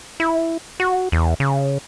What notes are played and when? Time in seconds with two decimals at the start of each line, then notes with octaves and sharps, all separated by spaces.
0.20 E4
0.80 F#4
1.12 E2
1.40 C#3